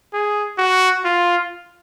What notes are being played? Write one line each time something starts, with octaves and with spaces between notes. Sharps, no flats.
G#4
F#4
F4